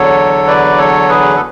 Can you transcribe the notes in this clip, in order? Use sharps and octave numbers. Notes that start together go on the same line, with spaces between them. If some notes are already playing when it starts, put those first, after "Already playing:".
Already playing: E2 D3 F#3 A4 C#5
B4 D5
A4 C#5
G#4 B4
A4